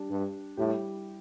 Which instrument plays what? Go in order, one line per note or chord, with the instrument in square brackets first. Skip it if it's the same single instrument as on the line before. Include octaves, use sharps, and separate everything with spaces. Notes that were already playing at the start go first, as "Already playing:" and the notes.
Already playing: [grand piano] G3 D4 G4
[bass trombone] G2
[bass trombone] A2 [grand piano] G3 E4 G4